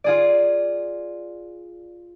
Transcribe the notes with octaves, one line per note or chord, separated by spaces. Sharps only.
F4 G#4 D5